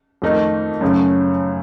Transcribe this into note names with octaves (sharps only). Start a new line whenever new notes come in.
F2 D#3 A3 D#4 A#4
F#2 C#3 A3